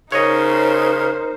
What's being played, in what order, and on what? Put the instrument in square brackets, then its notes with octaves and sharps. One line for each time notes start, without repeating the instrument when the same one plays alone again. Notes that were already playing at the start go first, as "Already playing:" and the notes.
[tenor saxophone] C#3 [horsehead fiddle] D#4 C5 [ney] A#4 [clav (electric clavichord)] C#5 D#5